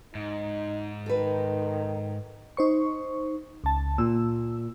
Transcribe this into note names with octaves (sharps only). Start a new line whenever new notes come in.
G#2 D#4
D#3 A4 B4
D#4 C5 C#6
C#2 A5
A#2 E6